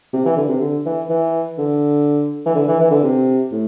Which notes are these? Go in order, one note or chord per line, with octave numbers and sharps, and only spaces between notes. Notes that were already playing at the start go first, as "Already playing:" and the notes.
C3
E3
D3
C3
D3
E3
E3
D3
E3
D3
E3
E3
D3
C3
A2